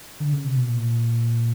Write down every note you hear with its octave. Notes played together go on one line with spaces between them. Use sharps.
D3
C#3
C3
B2
A#2